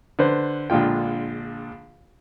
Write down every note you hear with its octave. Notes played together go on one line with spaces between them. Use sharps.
D3 B4 C5
A#1 D3 G#3 F4 G5